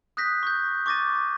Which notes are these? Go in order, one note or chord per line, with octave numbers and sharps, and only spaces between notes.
D#6 F#6 G6 A#6 B6
C#6 G6
C#6 D6 A6 A#6 D#7